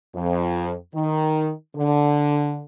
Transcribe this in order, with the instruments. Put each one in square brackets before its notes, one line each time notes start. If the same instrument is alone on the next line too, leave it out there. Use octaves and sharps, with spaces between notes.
[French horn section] F2
D#3
D3